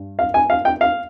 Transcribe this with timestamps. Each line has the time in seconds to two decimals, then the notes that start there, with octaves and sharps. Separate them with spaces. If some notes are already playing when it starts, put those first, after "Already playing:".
Already playing: G2
0.19 F5
0.34 G#5
0.50 F5
0.65 G5
0.81 F5